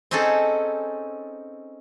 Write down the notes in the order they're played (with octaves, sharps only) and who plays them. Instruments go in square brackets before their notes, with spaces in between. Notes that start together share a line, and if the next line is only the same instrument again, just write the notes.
[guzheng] C4 C#4 D#4 G#4 A4